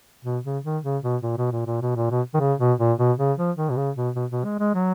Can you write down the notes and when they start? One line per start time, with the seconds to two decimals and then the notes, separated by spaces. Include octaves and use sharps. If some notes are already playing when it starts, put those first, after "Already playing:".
0.25 B2
0.45 C#3
0.65 D#3
0.84 C#3
1.03 B2
1.23 A#2
1.38 B2
1.52 A#2
1.67 A#2
1.82 B2
1.96 A#2
2.11 B2
2.34 D#3
2.40 C#3
2.59 B2
2.79 A#2
2.98 B2
3.19 C#3
3.38 F3
3.57 D#3
3.70 B2
3.77 C#3
3.96 B2
4.15 B2
4.31 B2
4.45 G#3
4.59 G#3
4.75 F#3